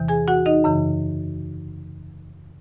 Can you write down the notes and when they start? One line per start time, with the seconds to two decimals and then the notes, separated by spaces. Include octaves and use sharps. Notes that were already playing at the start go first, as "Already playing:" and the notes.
Already playing: E2 C3 E3
0.08 G#4 G#5
0.28 F#4 F#5
0.46 D#4 D#5
0.64 F#2 C#3 E3